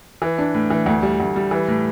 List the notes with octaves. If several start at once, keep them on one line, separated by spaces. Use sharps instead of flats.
E3
D4
A2
E3
D2
G3
D2
G3
E3
A2